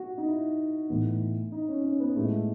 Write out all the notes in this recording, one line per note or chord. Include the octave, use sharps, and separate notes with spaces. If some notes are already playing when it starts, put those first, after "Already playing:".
Already playing: F#4
D#4
E4
A2 E3 B3 D#4
D#4
C#4
C#4
B3
A2 G#3 A3 B3 E4